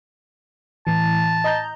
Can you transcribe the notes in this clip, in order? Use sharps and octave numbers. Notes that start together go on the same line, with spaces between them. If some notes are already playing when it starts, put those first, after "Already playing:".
A2 E3 A5
D#5 A#5 G6